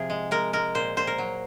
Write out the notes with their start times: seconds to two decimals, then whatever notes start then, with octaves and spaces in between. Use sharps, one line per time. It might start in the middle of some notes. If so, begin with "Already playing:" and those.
Already playing: C3 F3 G#4
0.10 G#3
0.31 G#3 A#4
0.53 G#3 A#4
0.75 A#2 C5
0.97 A#2 C5
1.07 A#4
1.18 F#3